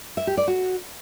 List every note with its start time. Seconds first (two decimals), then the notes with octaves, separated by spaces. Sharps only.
0.17 E5
0.27 G4
0.37 D5
0.48 F#4